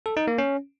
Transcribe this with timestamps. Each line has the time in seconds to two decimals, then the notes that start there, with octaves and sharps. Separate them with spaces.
0.06 A4
0.17 D#4
0.27 A#3
0.38 C#4